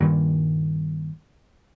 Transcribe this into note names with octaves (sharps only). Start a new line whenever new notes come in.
D#1 G2 A#2 D#3